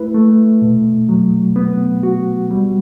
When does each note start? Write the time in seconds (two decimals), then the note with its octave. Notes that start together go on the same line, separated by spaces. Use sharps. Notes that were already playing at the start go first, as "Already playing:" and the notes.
Already playing: A3 E4 B4
0.14 A3
0.62 B2
1.09 F#3
1.56 B3
2.03 F#4
2.51 G3